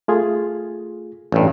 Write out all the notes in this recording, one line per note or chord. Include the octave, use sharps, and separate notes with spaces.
A3 F4 G#4
A1 G2